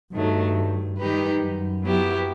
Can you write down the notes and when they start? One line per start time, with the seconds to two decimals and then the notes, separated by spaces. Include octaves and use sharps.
0.13 G2 D#3 F#3 A3
0.99 D#3 G3 D#4 G4 B4
1.42 F#2
1.84 F#3 B3 E4 G4